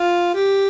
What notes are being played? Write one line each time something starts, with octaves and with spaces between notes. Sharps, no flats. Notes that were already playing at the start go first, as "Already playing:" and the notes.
Already playing: F4
G4